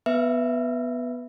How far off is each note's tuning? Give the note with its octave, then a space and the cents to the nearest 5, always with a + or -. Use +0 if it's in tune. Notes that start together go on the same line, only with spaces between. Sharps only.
B3 +0 B4 +0 E5 +5